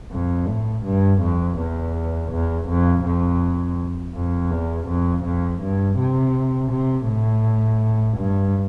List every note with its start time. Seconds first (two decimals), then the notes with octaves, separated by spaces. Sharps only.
0.12 F2
0.48 A2
0.85 G2
1.21 F2
1.59 E2
2.32 E2
2.68 F2
3.05 F2
4.15 F2
4.51 E2
4.88 F2
5.24 F2
5.61 G2
5.98 C3
6.71 C3
7.08 A2
8.18 G2